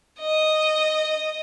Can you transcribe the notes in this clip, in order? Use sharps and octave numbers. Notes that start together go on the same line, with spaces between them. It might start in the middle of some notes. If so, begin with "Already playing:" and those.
D#5